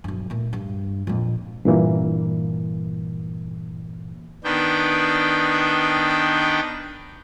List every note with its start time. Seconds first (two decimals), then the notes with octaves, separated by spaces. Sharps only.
0.04 B1 G2
0.30 A#2 A3
0.53 G2
1.07 F2 A#2
1.65 G2 A#2 E3 A#3
4.44 D#3 B3 D4 G5